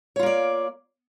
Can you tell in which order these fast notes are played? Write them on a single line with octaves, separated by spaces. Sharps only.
C#5 F4 A#3 D5